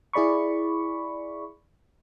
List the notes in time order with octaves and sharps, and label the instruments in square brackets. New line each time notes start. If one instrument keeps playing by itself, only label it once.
[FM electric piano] E4 G#4 D5 B5 C#6